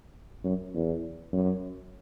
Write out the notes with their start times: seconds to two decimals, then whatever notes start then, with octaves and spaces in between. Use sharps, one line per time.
0.45 F#2
0.74 E2
1.33 F#2